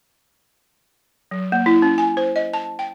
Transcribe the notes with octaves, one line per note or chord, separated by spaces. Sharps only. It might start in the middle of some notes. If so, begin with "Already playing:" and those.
F#3
A#3
E4
C#4
G#5
C5
D#5
A5
G5